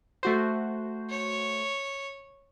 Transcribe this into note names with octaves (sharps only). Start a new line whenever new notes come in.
A3 F#4 C5
C#5